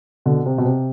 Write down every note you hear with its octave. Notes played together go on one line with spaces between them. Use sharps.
B2 D3
C3
B2
C3